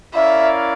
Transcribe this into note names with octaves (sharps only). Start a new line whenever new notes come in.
C#4 E4 A#4 D5 E5 F5